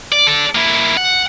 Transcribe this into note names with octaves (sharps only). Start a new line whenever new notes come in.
D5
A4 D5
A#3 E4
F#5